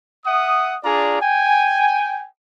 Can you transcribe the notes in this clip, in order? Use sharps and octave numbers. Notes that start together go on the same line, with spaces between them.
E5 F#5 D#6
D4 F4 G#4 D5 A#5
G5 G#5